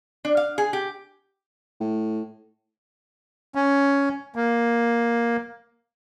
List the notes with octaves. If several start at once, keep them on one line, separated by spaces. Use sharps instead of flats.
D4
F5
G#4
G4
A2
C#4
A#3